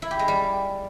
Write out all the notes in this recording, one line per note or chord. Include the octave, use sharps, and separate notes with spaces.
E4
G4
G#3
G3